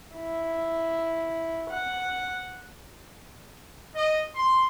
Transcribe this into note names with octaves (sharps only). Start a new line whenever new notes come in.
E4
F#5
D#5
C6